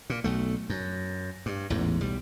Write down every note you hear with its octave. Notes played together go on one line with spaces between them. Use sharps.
A#2
B1 A3
F#2
G2
A1 E2 G#2
B1 G3